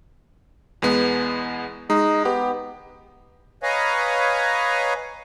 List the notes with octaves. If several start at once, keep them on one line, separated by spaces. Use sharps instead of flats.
E2 G#3 B3
G#3 D#4
B3 G4
B4 C#5 D#5 F5 G#5 A#5